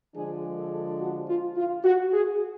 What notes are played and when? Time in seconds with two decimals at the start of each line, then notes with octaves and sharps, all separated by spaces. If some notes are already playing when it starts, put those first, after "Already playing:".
0.14 D3 F3 G#3 D4 G#4
0.56 A4
0.99 F#4
1.27 F4
1.55 F4
1.84 F#4
2.12 G#4